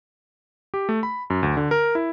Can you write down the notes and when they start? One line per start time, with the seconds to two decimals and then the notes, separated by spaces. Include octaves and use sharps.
0.74 G4
0.89 A3
1.03 B5
1.30 F#2
1.43 D2
1.57 D3
1.71 A#4
1.95 E4